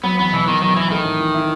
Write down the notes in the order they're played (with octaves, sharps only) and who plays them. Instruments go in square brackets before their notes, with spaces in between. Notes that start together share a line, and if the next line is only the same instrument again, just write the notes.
[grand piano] F#3 [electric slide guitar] B3
[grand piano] E2 [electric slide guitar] B3
[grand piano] B2 [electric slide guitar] E3
[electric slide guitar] D#3 [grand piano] B3
[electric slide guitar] D#3 [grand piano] F#3
[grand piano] E2 [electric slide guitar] E3
[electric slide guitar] D#3 [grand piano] A3
[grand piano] A2
E3
E4